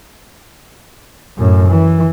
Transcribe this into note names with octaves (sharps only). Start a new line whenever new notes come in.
F#2 A2
E3